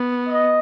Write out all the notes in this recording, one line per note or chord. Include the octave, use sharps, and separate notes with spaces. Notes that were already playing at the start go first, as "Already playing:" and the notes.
Already playing: B3
D#5